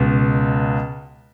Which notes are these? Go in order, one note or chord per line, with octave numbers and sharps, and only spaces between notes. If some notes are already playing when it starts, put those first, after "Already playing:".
Already playing: C#2 B2